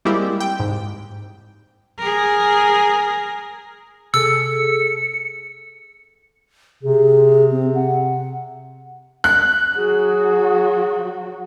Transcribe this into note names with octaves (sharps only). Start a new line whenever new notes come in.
G3 G#3 A#3 C4 E4 G4
G5
G#2
G#4 A#4
C3 G#4 A4 E6 C#7
C3 G#4
C4
F#5
F#6
F#3 F#4 G#4